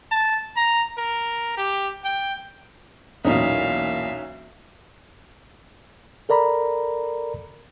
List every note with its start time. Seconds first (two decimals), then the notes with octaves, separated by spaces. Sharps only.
0.11 A5
0.56 A#5
0.98 A#4
1.57 G4
2.04 G5
3.25 B1 E2 A#2 C#4 D#4 E5 F5
6.29 A4 A#4 D5 A#5 B5